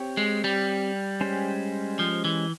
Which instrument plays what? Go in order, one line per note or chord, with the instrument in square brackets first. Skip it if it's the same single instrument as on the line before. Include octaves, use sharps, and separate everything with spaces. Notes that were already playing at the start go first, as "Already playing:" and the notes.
Already playing: [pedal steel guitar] C4 G4 C#5
[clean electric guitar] G#3
G3
[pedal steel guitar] G#3 C#4 G4 C5
[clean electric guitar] F3
E3